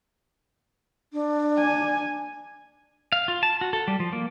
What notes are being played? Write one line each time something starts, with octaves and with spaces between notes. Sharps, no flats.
D4
G#5
F5
F4
A5
F#4
A4
G3
F3
A#3